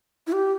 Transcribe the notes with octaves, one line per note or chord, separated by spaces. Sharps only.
E4
G4